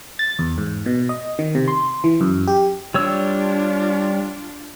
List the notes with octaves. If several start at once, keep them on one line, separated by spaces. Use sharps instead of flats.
A6
E2
G#2
B2
D#5
D#3
C3
C6
E3
F#2
G4
G3 D4 F4 C#5 E6